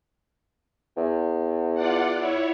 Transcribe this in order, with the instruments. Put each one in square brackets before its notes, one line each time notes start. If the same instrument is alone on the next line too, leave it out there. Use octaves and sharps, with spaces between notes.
[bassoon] E2
[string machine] F4 D5 F#5
E4 C#5